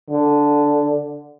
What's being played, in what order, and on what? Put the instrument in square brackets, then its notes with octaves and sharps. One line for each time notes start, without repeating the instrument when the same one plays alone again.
[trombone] D3